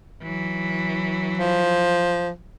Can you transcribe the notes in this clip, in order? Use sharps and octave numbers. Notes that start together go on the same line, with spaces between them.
E3 F#3
F3